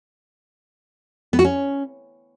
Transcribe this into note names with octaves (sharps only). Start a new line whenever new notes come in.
B3
F#4
C#4